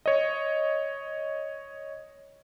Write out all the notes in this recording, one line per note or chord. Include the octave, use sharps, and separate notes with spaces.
C#5 D#5